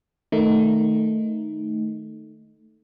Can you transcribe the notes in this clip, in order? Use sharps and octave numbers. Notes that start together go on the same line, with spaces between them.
D#3 A3 D#4